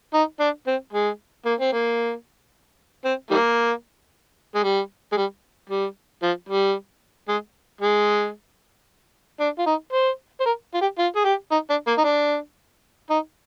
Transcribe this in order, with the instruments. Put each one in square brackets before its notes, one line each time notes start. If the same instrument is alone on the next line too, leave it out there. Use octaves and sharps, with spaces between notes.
[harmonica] D#4
D4
C4
G#3
A#3
C4
A#3
C4
D#3 G3 A#3
G#3
G3
G#3
G3
G3
F3
G3
G#3
G#3
D4
F4
D#4
C5
C5
A#4
F4
G4
F4
G#4
G4
D#4
D4
A#3
D#4
D4
D#4